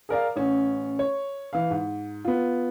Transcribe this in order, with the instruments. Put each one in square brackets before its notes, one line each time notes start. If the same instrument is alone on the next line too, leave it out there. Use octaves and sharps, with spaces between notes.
[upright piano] G#4 A#4 D5 F5
A1 C#4
C#5
E3 F5
G#2
B3 F4